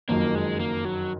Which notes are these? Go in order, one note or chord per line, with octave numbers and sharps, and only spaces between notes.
F#1 F2 D#3 F#3 A#3
G#3
A#3
F#3